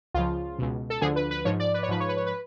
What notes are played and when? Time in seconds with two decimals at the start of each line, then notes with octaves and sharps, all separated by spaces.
0.14 C#2 C#3 F3 F4
0.59 C#2 B2
0.90 A4
1.01 D2 D3 F3 G#4
1.16 B4
1.31 B4
1.45 G#2 F3 C#5
1.60 D5
1.74 B4
1.83 C#5
1.89 G#2 F3 B4
2.00 C#5
2.09 B4
2.17 C#5
2.26 B4